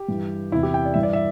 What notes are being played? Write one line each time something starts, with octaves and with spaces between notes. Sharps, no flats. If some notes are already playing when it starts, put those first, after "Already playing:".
Already playing: G4
G2 E3
E2 C3 E3 E4
G4
G5
D5
G2 E3 E5
D5
E5